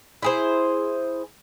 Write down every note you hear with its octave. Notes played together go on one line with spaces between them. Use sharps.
E4 G#4 C5